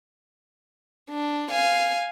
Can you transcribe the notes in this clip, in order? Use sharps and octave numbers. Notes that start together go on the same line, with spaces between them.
D4
F5 G#5